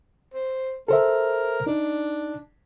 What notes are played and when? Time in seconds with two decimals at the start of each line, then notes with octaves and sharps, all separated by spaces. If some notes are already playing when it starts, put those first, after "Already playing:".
0.34 C5
0.88 A4 A#4 C5 E5
1.67 D4 D#4